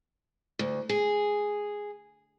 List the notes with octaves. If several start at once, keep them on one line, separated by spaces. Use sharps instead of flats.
D2
G#4